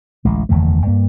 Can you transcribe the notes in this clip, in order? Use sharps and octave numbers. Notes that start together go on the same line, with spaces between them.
A1 D2 G#3
F#1 E2 D#3 A3
G2 A#3